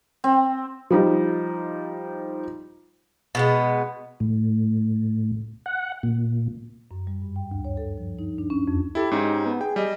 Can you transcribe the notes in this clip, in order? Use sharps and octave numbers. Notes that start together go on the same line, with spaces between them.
C4
F3 G3 D#4
B2 G#3 B3
A2
F#5
A#2
F#2
G3
G2
G5
D2
C#5
A4
F3
D#4
D4
C#4
F2
E4 G4 A4
G#2 C#4 D#4
B3
G#4 G5
G3 D#5